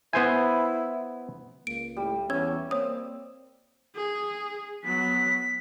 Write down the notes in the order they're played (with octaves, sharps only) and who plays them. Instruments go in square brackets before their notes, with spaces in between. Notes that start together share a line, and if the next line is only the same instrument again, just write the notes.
[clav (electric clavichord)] B3 C5 G#5 [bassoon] E4
[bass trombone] C#2 [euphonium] A#3 [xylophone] D7
[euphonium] A2 [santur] G3
[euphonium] E2 [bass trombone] C#4 [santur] E6 [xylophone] G#6
[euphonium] A#3 [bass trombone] C4 [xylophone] C#5 D#6
[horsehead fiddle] G#4
[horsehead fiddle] F#3 B3 [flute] B6